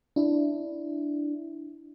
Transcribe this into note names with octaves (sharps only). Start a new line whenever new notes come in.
D4 E4